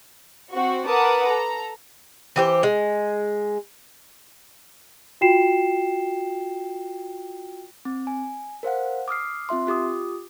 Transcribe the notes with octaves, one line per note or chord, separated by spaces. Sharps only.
C4 F#4 C#6
A#4 B4 F#5 A5 D6 D#6
A4 A#5
E3 G4 C5
G#3
F4 F#4 G5 C7 E7
C4
G#5
A#4 C5 F5 F#5
D6 D#6 F6 C7
C4 F4 E5 C6
F4 G4 D6 D#6